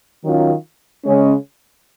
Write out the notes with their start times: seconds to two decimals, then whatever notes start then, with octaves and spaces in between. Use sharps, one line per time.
0.23 D#3 F#3 C#4 F4
1.04 C#3 G#3 C#4